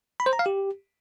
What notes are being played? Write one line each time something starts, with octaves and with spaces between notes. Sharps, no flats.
B5
C5
A#5
F5
G4